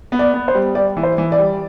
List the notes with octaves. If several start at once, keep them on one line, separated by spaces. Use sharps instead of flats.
B3
D5
B3
C5
G3
G3 D5
E3
C5
E3
D5
G3